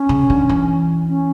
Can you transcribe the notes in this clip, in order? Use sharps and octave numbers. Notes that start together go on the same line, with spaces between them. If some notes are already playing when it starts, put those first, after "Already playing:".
Already playing: C#4
C#3
D3
E3
C#4